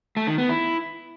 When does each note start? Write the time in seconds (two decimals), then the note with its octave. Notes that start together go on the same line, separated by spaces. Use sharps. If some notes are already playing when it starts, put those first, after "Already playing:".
0.17 A3
0.27 D#3
0.38 B3
0.49 E4